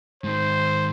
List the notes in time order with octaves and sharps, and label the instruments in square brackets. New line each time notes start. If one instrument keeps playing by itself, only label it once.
[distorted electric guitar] G#2 D#3 [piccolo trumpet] C5